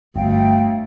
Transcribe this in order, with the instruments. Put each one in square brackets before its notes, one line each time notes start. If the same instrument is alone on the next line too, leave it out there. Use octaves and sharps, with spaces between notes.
[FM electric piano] G1 [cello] D2 A3 [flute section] F5 G5